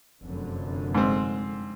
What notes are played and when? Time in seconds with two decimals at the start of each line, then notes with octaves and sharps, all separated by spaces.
0.22 F1 F#2 D3
0.95 G#2 C4